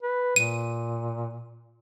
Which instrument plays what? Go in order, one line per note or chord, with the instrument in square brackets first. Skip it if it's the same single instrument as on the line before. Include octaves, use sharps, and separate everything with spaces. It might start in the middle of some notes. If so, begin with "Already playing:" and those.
[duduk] B4
[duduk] A#2 [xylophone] D#7